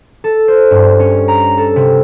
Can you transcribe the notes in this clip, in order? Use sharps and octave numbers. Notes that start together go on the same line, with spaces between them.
A4
C5
G2
C#4
A#5
A4
C3